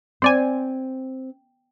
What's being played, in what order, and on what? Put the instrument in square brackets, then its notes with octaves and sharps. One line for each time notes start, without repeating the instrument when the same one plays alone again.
[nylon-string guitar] C4 [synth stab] C5 D5 G#5